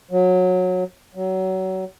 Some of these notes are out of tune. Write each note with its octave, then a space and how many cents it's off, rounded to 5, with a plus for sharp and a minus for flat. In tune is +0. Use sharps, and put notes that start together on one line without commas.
F#3 -20
F#3 +25